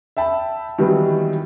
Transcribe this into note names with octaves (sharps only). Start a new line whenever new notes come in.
E5 G5 A5 B5
D#3 E3 F#3 G3 B3 D#4